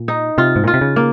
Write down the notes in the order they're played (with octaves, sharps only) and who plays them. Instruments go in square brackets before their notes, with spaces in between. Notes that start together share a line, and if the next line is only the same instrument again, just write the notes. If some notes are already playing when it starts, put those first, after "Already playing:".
Already playing: [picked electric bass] A#2
[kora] D#4
[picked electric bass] C3 [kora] F4
[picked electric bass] G#2
[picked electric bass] A#2 [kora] F4
[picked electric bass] C3
C#3
[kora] A#3